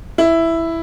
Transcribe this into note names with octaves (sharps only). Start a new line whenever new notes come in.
E4